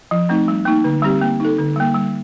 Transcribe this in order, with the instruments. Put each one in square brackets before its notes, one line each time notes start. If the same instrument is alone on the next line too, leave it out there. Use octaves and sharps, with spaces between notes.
[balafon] F3
A3 C4 D#4
G3
A#3 D#4
D3
G3 C4 G4
A#3
D#4 A4
D3
G3 A#3
G3